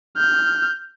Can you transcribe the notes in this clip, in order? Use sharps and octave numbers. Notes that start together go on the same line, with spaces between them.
F6 G6